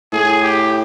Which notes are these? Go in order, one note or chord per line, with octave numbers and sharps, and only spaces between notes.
A2 G#4
G4